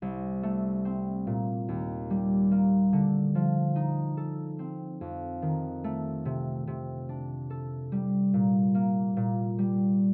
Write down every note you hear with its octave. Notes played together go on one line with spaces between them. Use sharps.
C2
A3
C4
A#2
D#2
G3
A#3
D3
F3
D#4
A4
C4
F2
D#3
A3
C3
C3
D4
A4
G3
A#2
A#3
A#2
G3